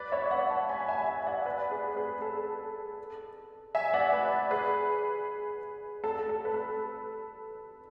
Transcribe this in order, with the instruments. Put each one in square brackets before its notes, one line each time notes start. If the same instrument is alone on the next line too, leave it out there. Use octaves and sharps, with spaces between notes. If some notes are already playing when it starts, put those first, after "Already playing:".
Already playing: [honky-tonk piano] B4 D5
C#5 E5
D5 F#5
F#5 A5
G#5 B5
E5 G#5
E5 G#5
E5
D5 F#5
B4 D5
G#4 B4
G#4 B4
A4
E5 G#5
D5 F#5
B4 D5
G#4 B4
A4
A4
B4
A4